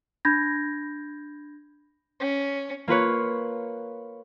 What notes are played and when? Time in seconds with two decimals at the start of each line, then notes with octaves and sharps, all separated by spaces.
0.25 D4 B5 G6 G#6 A#6
2.20 C#4
2.88 A#3 F4 B4 C#5